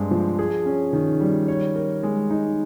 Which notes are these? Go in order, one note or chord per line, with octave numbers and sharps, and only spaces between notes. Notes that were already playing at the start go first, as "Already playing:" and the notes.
Already playing: G2 G#3 C4
F3
G#4
C#4
D#3
G3
C#5
A#4
G#3
D#4